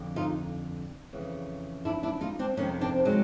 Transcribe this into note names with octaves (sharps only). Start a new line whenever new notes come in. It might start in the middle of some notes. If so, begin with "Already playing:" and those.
Already playing: F2 D3
D#4 F4
F2 C#3 E3
D4 E4
D4 E4
D#4 F4
C4 D4
F2 C3 D#3 C#4 D#4
C4 D4
F#3 G#3